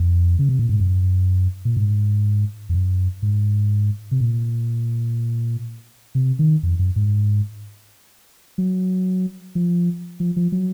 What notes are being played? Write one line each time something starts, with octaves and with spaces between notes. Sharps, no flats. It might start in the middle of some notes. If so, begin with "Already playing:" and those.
Already playing: F2
C#3
C3
A#2
G#2
F#2
A#2
G#2
F2
F#2
G#2
C3
A#2
C3
D#3
F2
F#2
G#2
F#3
F3
F3
F3
F#3